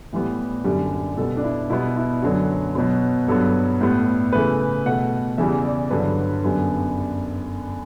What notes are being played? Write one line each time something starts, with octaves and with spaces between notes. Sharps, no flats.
A2 E3 G3 B3
F#2 D3 G3
B2 G3 B3 A4
D4
E4
B2 G3 B3 E4
E4
F#2 D3 F#3 B3 F#4
B2 F#3 B3
G2 F#3 B3 A4
A2 G3 B3
C#3 E3 A3 B4
B2 A3 F#5
E2 C#3 E3 G3 E5
D5
G2 D3 F#3 B4
F#2 D3 G3 B3